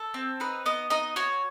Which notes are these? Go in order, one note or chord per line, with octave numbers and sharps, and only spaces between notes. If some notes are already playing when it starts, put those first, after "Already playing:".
Already playing: A4
C4
D#4 B4
B3 D#5
D#4 D#5
F#4 C#5